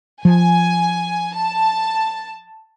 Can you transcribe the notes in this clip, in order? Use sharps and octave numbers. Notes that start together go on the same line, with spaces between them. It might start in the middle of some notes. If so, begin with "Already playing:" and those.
F3 G#5
A5